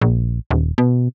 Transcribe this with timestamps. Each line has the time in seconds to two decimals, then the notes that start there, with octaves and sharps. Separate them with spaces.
0.01 A#1
0.51 D#1
0.78 B2